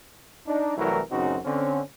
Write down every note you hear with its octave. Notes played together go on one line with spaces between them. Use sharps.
D4 D#4
C2 E3 F#3 A3 E4 A#4
A1 F#2 C#3 C4 D#4 F#4
D3 C4 C#4